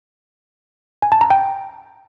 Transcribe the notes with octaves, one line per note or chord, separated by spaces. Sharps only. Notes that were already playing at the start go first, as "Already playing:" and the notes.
G#5
A5
A#5
G5